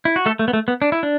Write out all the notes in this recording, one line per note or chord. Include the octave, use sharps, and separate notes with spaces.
E4
F#4
A3 A4
A3
B3
A3
B3
D4
E4
D4